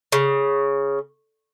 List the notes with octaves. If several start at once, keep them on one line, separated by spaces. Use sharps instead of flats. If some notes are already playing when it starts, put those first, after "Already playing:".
C#3